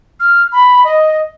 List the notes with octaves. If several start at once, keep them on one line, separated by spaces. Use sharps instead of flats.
F6
B5
D#5